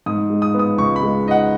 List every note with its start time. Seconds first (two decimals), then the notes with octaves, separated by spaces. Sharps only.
0.06 G#2 D#6
0.30 G#3
0.42 D#6
0.54 B3
0.59 D#6
0.78 C#2 C#6
0.96 B5
1.02 G#3
1.25 D#4 D#5
1.31 F#5